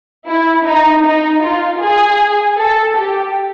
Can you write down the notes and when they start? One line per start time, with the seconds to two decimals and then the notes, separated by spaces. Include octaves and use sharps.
0.25 E4
0.64 D#4
1.02 D#4
1.41 F4
1.80 G#4
2.57 A4
2.96 G4